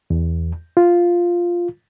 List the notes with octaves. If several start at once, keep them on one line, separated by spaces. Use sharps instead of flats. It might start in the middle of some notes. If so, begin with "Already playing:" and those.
E2
F4